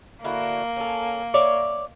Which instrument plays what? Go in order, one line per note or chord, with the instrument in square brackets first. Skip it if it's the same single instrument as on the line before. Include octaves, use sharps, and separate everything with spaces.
[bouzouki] D3 E4 F#4 [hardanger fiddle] A#3
[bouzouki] C#4 A4
C#5 D5 E5